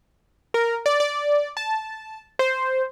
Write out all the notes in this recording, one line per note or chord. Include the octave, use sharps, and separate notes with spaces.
A#4
D5
D5
A5
C5